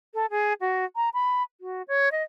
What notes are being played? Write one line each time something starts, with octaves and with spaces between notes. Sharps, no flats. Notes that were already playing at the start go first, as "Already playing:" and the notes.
A4
G#4
F#4
A#5
B5
F#4
C#5
D#5